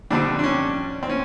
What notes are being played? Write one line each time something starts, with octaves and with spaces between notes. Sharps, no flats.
F2 D3 G3 C4 D4
D4
C#4
C4
C#4